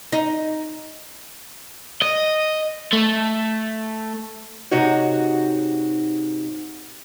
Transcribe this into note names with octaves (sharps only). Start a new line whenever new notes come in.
D#4
D#5
A3
G#2 C3 D#4 F#4 C#5